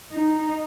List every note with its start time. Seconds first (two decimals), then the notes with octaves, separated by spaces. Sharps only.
0.16 D#4